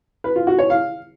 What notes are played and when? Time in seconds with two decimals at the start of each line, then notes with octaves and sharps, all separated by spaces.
0.24 B4
0.36 F4
0.47 F#4
0.59 C#5
0.70 F5